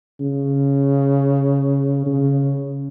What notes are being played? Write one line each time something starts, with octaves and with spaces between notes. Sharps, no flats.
C#3
C#3